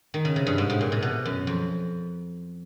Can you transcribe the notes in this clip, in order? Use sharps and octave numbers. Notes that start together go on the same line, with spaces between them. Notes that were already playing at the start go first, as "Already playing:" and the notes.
D#3
C#3
C3
G2
G#2
A2
A#2
C3
B2
F#2
F2